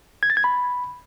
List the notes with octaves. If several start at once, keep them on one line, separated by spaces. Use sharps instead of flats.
G#6
A6
G#6
B5